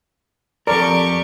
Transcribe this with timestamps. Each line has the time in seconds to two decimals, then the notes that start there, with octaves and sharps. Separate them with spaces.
0.67 F2 G4 A4 A#4 D5 C#6